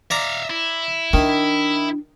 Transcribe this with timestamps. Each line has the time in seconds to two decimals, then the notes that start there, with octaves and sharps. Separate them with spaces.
0.11 D5 E5 F5 A#5
0.50 E4
1.13 D#3 D4